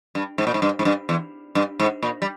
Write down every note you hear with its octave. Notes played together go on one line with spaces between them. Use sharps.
G2
G#2
A#2
G#2
G2
G#2
G2
E2
G2
G#2
A#2
G3